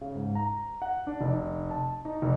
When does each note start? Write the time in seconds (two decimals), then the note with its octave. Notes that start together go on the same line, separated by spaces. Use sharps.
0.01 C#3
0.16 G#2
0.35 A#5
0.82 F#5
1.07 D4
1.21 F1
1.70 A5
2.05 D#4
2.22 F1